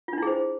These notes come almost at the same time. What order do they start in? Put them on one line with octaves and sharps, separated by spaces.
F4 D4 E4 G#4 C5